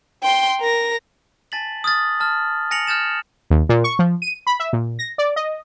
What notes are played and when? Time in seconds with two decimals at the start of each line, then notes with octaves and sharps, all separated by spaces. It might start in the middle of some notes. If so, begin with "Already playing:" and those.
0.23 G5 C6
0.60 A#4 A#6
1.52 G#5 A5 A6 B6 F#7
1.84 D#6 F6 G#6 A6
2.20 A5 F6
2.71 G#5 A#6 C#7 F7 F#7
2.87 F6 G6 A6 E7
3.50 D#2
3.69 A#2
3.84 C#6
3.99 F3
4.22 D#7
4.47 B5
4.60 E5
4.73 A#2
4.99 A#6
5.18 D5
5.36 D#5